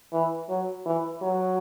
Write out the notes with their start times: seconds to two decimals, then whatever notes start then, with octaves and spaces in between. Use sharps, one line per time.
0.13 E3
0.49 F#3
0.86 E3
1.22 F#3